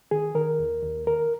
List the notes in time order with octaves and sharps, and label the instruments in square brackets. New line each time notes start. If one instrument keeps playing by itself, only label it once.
[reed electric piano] D#3 G#4
D#3 A#4
D#2
D#2
D#3 A#4